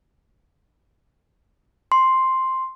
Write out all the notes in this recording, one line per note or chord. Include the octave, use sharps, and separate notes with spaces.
C6